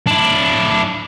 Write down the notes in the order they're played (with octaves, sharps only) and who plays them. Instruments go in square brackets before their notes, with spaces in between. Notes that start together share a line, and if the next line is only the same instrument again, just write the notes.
[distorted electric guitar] D4 E4